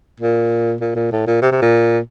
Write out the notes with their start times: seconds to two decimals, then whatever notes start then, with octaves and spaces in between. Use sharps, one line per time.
0.20 A#2
0.81 A#2
0.96 A#2
1.12 A2
1.27 A#2
1.42 C3
1.52 C3
1.62 A#2